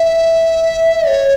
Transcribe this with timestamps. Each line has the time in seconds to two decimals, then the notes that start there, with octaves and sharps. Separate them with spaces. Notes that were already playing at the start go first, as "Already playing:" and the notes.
Already playing: E5
1.07 C#5